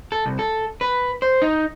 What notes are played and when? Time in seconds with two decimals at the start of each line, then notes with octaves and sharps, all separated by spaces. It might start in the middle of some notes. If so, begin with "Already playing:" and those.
0.12 A4
0.25 C2
0.39 A4
0.81 B4
1.22 C5
1.42 D#4